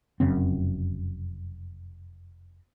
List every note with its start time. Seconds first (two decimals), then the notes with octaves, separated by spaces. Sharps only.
0.20 F1 F#2 C#3 C4